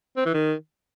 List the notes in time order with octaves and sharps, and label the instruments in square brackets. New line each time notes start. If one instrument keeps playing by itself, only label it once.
[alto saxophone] C4
E3
D#3